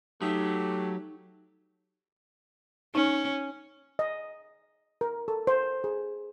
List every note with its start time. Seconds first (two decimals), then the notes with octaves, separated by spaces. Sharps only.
0.22 F#3 A3 D#4 G4
2.95 C#4 D#4
3.99 D#5
5.01 A#4
5.28 A4
5.47 C5
5.84 G#4